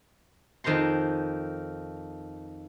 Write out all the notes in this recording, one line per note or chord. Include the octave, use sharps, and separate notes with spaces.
F2 D#3 C5 A#5 C6